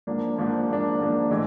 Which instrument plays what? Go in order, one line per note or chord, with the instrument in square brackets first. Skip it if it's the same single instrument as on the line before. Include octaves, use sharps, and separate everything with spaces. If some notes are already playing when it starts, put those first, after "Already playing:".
[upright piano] G#2 F3 A#3 D4
G#2 F3 A#3 D4
G#2 F3 A#3 D4
G#2 F3 A#3 D4
A2 E3 G#3